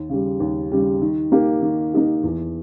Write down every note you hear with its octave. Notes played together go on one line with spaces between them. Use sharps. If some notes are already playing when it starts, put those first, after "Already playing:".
Already playing: D#2
C#3 G3
D#2
C#3 G3
D#3
A#3 D#4 G4
D#3
A#3 D#4 G4
E2